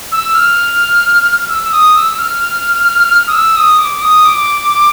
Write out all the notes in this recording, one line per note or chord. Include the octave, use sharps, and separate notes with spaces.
E6
F6
E6
E6
D#6
E6
F6
D#6
E6
D#6
D6
D#6
D6